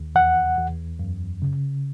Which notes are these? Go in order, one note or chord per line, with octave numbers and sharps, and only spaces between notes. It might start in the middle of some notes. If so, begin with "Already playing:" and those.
Already playing: D#2
E2 F#5
E2
F#2
C#3